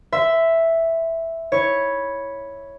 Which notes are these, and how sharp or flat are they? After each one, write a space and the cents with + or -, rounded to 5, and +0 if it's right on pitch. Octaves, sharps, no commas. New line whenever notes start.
E5 +0 C6 -35
E4 -10 C#5 +0